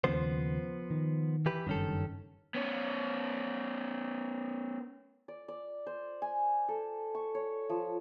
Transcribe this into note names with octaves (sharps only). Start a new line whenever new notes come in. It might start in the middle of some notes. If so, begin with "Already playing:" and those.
D#2 C#3 F3 B3 C5
D#3
E3 G4 B4
F#1 G2 D#3 C#4 A4
B3 C#4
D5
D5
C5
G#5
A4
C#6
C#5
F3